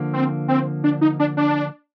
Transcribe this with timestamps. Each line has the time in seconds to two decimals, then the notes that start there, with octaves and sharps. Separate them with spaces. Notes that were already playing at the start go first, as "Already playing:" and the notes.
Already playing: D3 F3 A#3
0.13 C4
0.48 C4
0.84 D4
1.01 D#4
1.19 D4
1.37 D4